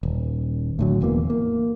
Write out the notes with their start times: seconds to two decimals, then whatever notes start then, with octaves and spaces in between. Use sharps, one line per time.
0.03 D#1
0.79 A2 D3 F#3
1.01 E1 E2 E3 A#3
1.30 A#3